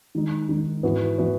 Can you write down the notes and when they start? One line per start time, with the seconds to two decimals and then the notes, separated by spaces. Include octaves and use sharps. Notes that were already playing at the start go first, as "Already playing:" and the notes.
0.15 D#3 G#3 D#4
0.49 D#3 G#3 D#4
0.83 G#2 E3 B3 F#4 B4
1.18 E3 B3 F#4 B4